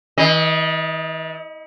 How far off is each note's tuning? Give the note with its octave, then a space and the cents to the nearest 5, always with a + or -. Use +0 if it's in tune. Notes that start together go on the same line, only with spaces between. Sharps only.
E3 -45 D#5 +0